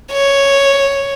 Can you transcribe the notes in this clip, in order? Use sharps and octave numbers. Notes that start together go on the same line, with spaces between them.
C#5